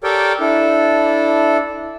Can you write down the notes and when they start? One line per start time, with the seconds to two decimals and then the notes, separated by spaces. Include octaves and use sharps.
0.04 G4 A4 A#4 C#5 D5 G5
0.40 D4 E4 A4